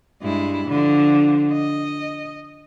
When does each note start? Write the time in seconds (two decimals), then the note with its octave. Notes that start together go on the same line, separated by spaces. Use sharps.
0.22 G2 G#3 E4
0.68 D3 F3
1.53 D#5